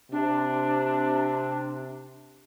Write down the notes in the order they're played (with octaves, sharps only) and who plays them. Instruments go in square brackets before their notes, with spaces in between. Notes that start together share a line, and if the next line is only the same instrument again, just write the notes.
[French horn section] C3 [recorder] D4